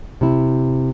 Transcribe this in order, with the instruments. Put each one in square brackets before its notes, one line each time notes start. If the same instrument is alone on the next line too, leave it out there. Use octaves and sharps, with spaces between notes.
[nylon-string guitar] C3 E4